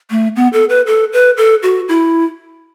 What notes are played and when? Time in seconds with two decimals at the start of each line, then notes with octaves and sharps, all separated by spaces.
0.10 A3
0.36 B3
0.53 A4
0.69 B4
0.87 A4
1.13 B4
1.37 A4
1.63 F#4
1.88 E4